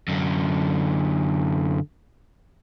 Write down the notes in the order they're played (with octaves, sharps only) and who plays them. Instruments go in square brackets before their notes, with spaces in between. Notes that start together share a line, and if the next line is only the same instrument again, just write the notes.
[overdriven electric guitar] F#2 D3